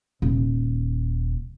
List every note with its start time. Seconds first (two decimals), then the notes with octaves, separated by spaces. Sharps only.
0.22 D#1